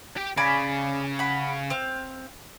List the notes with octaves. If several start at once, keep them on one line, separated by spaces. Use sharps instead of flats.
G4 G5
C#3 D5 G#5 B5
F#5 B5
C4 F5